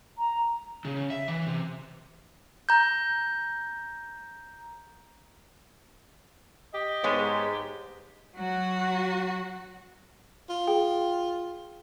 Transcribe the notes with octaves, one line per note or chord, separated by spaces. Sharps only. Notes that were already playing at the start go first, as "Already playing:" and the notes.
A#5
C#3
E5
E3
C3
A#5 G6
G4 D#5
G#2 G#3 B3 C#5
F#3 F#4
F4
G#4 G5